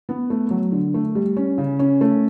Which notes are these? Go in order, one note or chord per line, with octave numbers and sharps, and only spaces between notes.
B3
A3
F#3
D3
A3
G3
C#4
C#3
C#4
A3